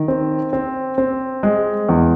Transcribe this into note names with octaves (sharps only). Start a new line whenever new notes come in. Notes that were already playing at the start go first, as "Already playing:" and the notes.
Already playing: D#3
C4
C4
C4
G#3
E2